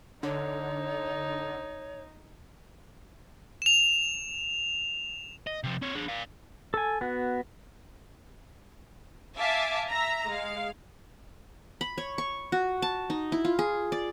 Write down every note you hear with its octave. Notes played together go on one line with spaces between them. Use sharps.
D3 D#4 C#5
E7 F7
D#5
C3 F3
C4 C#5
D4 G#4
D5 F5
A4 G#5
B3 F#4
E5 F5 G#5 A5 D6
E5 A#5
G#3 F5
B5
C#5
C#6
F#4
A5
D#4
E4
F4
G#4
D5